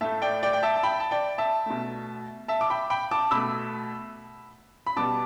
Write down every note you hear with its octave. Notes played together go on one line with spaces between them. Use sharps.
A2 A3 E5 A5
D5 G5
D5 G5
G5
E5 A5
A5
G5 B5
A5
D5 G5
E5 A5
B2 A3
E5 A5
D6
G5 B5
G5 B5
A5 D6
B2 A3 B5 E6
B5
B2 G3 B3 A5 D6